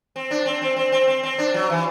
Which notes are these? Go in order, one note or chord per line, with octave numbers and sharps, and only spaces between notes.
C4
D4
C4
C4
C4
C4
C4
C4
D4
F#3
E3